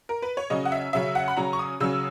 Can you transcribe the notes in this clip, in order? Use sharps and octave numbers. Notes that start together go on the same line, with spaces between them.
A#4
B4
C#5
C#3 F#3 C#4 D#5
F#5
E5
C#3 F#3 C#4 E5
F#5
B5
C#3 F#3 C#4 A#5
C#6
D#6
C#3 F#3 C#4 E6